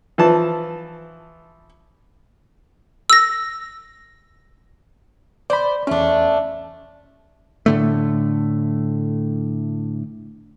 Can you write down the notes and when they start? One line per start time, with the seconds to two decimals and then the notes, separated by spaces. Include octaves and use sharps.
0.18 E3 F3 A5
3.10 E6 A#6
5.50 C5 D5 B5
5.87 E2 A3 C#4 D4
7.66 A2 D3 A3